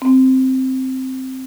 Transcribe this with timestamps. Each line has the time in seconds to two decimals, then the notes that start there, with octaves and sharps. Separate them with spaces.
0.02 C4